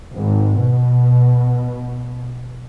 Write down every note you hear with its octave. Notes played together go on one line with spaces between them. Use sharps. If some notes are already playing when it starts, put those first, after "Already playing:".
G#1
B2